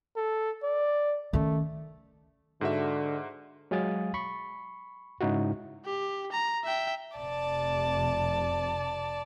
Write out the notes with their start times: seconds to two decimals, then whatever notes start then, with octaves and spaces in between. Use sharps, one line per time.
0.16 A4
0.63 D5
1.33 D#3 A3 C#4
2.61 G#2 D3 F#4 E5
3.71 F#3 G#3 F5 G#5 D#6 A6
4.14 B5 C#6
5.21 G#2 C#3 D#4 E4 F#4
5.85 G4
6.32 A#5
6.64 E5 G5
7.17 F1 C3 D5 A5